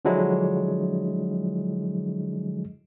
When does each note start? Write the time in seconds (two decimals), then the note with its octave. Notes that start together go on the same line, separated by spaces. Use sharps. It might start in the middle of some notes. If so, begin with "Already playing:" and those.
0.05 D3 F3 F#3 G#3 D4 E4